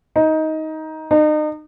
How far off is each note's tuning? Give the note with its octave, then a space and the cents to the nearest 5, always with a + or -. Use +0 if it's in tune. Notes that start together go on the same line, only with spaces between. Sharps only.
D#4 +15
D#4 -35